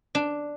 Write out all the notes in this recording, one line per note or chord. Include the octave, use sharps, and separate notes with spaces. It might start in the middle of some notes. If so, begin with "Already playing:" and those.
D4